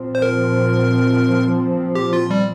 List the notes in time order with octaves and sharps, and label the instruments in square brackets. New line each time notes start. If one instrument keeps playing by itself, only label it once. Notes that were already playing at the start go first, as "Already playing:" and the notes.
Already playing: [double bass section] A#2 F3 C4
[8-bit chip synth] C5
A#4
G4
F4
G3